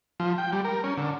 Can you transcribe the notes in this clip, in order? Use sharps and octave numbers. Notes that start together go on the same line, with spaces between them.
F3
G5
G3
A#4
C#4
D3